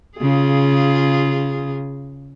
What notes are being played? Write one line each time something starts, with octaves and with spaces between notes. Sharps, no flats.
C#3 F4 G#4